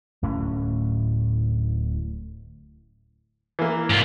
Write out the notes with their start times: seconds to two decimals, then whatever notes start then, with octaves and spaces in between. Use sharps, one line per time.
0.23 D1 A2 C#4
3.59 E3 A#3
3.90 G#2 F4